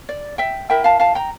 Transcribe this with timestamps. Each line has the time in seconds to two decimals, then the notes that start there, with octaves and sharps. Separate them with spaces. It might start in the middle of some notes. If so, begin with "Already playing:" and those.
0.09 D5
0.38 E5 G5
0.70 E4 A#4 E5 G5
0.84 F5 A5
1.00 F5 A5
1.15 G5 A#5